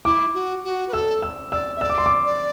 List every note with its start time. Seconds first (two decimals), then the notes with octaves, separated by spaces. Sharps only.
0.05 E4 D6
0.34 F#4
0.64 F#4
0.88 B4
0.93 A4 E6
1.22 E6
1.51 D5 E6
1.76 E5
1.81 D5 E6
1.90 D6
1.98 C6
2.06 D6
2.26 D5